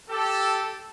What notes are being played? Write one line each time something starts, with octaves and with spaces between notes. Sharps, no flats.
G4 A4